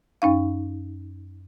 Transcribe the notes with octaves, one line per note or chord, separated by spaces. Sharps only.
F#2 C#4 D#4 F5